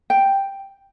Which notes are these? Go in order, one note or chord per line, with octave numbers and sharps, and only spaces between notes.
G5